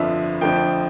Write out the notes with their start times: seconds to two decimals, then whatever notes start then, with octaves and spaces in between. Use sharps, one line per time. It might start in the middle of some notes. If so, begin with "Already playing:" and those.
Already playing: G1 F2 D3 F3 E5
0.41 F2 D3 F3 A3 G5